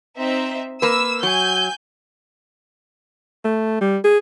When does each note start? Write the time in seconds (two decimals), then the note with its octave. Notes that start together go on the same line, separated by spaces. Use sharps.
0.19 C4 D#4 E5
0.82 A#3 B4 E6
1.23 F#3 G#5 G6
3.44 A3
3.81 G3
4.04 G#4